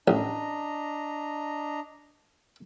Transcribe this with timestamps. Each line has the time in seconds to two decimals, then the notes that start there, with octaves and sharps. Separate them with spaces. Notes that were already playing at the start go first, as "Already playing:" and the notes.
0.08 A1 D4 D#5 A#5